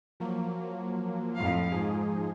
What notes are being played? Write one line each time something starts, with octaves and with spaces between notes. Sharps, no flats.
F3 F#3 A#3
F2 A2 F5
G#2 F3 D#4 G#4